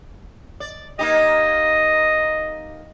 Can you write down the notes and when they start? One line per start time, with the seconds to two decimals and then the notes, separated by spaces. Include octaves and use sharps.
0.60 D5
0.99 A#3 D#4 G4 D#5